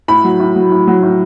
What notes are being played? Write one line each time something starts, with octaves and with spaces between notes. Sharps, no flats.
A2 B5
F#3
A2
F#3
A2
F#3
A2